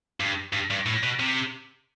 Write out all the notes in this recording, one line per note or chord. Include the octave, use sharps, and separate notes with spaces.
G2
G2
G2
A2
B2
C3